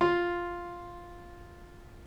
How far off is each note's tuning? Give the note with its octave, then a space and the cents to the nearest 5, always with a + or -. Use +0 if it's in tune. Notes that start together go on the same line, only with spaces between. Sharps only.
F4 +0 C6 +0